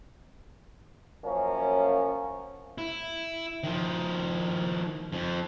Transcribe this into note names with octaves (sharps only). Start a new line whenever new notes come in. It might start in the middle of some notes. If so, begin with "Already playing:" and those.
F#2 F3 A#3 C#4
E4
D#3 F3
F2 F3